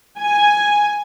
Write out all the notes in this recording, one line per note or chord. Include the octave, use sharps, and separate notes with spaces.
G#5